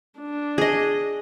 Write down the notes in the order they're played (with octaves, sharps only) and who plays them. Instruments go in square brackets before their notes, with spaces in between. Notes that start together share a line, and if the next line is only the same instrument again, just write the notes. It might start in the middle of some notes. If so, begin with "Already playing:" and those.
[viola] D4
[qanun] G#4 D#5